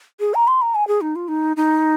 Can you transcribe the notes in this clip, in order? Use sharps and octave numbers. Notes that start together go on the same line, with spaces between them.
G#4
A#5
C6
A#5
G#5
G#4
D#4
F4
D#4
D#4